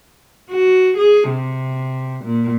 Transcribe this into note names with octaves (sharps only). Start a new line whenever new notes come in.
F#4
G#4
C3
A#2